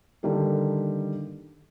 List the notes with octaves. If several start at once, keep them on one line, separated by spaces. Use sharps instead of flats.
D3 D#3 G3 A#3 A4